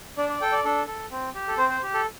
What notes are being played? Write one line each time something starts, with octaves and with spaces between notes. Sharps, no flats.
D4 D5
D5
A4 G5
D5
D4 A4
A4
C4
G4
A4
C4 C5
C5
G4
A4